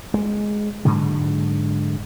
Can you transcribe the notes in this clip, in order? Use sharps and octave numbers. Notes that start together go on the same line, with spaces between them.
G#3
G#2 D3 F#3 G#3